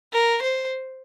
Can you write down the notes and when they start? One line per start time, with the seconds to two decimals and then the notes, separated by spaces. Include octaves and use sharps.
0.12 A#4
0.42 C5